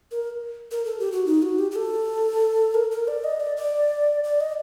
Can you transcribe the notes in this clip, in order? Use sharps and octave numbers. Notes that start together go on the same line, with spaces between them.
A#4
A#4
A4
G4
F#4
D#4
F#4
G4
G4
A4
A#4
A#4
D5
D#5
D5
D5
D5
D#5